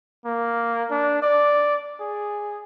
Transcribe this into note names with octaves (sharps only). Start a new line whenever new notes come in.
A#3
D4
D5
G#4